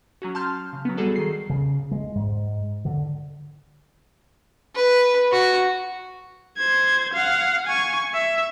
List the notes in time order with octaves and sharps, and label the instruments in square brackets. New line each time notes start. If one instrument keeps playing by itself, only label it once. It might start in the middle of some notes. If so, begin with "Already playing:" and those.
[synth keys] F#3 C#4 F#4
A5 C6 F6 G6
C#3
F#3 B3
G3 F#4 G#4 A4 D5
D#3 C7
[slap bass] C#3
G#3
G#2
D3
[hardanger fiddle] B4
F#4
[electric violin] C5 G#6
F5 F#5
G#5 C#6
E5